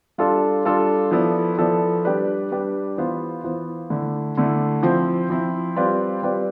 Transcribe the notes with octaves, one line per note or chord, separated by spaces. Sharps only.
G3 D4 F4 A4
G3 D4 F4 A4
F3 B3 E4 A4 D5
F3 B3 E4 A4 D5
G3 D4 G4 B4 D5
G3 D4 G4 B4 D5
E3 B3 F4 C5
E3 B3 F4 C5
D3 A3 E4
D3 A3 E4
F3 C4 E4
F3 C4 E4
G3 C4 F4 B4 D5
G3 C4 F4 B4 D5